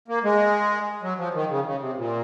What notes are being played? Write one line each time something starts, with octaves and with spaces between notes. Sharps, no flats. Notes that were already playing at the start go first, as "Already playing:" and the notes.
A#3
G#3
F#3
F3
D#3
C#3
C#3
C3
A#2